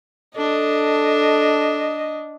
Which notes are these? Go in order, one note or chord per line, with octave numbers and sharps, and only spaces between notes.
D4 A4 D#5